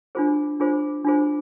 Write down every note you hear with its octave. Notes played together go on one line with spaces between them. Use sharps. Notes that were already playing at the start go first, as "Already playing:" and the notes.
D4 F4 G#4 C5
D4 F4 G#4 C5
D4 F4 G#4 C5